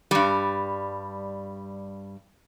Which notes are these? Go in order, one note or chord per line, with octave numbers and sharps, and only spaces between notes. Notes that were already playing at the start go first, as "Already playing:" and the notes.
G2 G3